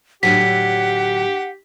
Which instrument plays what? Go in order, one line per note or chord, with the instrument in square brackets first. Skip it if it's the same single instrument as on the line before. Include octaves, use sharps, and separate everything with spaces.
[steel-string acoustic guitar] A2 D3 F#3 [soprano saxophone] G4 [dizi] F#5 [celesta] B6